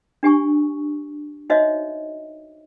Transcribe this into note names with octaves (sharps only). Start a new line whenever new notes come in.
D4 G4 G#5 C#6
D#4 F#4 C5 C#5 D#5 E5